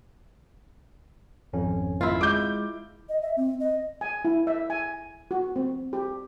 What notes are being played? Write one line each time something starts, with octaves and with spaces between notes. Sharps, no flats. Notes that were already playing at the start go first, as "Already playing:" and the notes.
G#1 F2 C#4
E4 F4
G#3 D6 G6
D#5
E5
C4
D#5
G#5
E4
E5
G#5
F#4
C4
G4